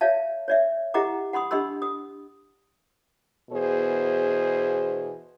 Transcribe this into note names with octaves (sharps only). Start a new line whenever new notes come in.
C#5 D5 E5 F5 A5
C#5 D5 E5
E4 G4 D#5 F#5 A#5 D6
F#5 B5 C6 D#6
D4 G4 D#5 B5 C6 E6
D#6
E2 B2 G#4 C5